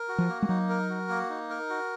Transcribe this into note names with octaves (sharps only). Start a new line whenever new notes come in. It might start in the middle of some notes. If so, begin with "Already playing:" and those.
Already playing: A#4
F#4
F3
A#3
G#3
F#3 D#4
A#4
F#4
A#3
D#4
A#4
F#4